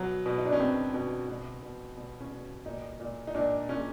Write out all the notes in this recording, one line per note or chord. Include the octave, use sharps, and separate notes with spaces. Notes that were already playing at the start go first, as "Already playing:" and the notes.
Already playing: B2 F#3
B2
D#4
D4
C#4
B2 C4
B2
B2
B2
B2
C#4
B2
A#2 D#4
A#2
D#4
A#2 D4
A#2 C#4